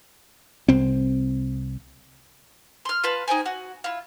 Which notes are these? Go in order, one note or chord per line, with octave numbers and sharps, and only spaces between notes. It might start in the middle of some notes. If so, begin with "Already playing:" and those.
C2 C4
C6 F6
F4 B4 A5
D#4 C5 G5 G#5
F#4
E4 F4